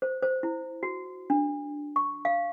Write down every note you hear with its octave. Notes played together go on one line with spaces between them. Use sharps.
C5
C5
E4
F#4
D4
C#6
F5